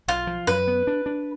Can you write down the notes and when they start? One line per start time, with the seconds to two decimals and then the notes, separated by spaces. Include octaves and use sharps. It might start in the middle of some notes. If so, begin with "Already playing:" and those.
0.08 B1 F4
0.27 F3
0.47 F#2 B4
0.67 B3
0.87 D4
1.06 D4